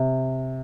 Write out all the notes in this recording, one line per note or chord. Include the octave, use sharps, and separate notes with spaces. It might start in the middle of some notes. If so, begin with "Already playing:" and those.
Already playing: C3